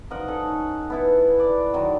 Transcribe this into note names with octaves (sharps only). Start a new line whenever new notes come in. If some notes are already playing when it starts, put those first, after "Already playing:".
F3 A#4 D#5 F#5
C#4 D#4 A4 A5
B3 E4 A4
D5
D3 D#3 F#3